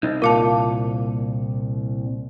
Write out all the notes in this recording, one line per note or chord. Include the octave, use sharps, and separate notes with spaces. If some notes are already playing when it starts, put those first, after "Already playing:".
C2 D#4
A#2 F4 A#4 F5 A5 D6